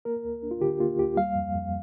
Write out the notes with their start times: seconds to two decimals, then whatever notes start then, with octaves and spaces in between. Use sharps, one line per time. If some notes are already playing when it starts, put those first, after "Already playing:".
0.05 A#3 A#4
0.24 D2
0.43 D4
0.51 F4
0.61 D3 G4
0.80 A#3 F4
0.99 D2 G4
1.17 G3 F5
1.36 F2
1.55 F2